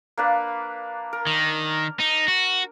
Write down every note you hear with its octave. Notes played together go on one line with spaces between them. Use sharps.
A#3 D4 B4
A#4
D#3
D#4
F#4